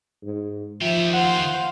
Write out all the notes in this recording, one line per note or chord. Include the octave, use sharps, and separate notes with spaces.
G#2
D#3 F3 G4 E5
C5 F5 F#5